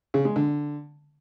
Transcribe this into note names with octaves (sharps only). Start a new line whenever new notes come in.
C#3
G#3
D3